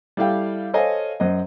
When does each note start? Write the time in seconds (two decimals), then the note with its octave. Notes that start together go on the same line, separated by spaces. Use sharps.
0.17 G3 E4 A4 F5 G5
0.74 A4 C5 C#5 D#5 F5 G#5
1.20 F#2 C5 D#5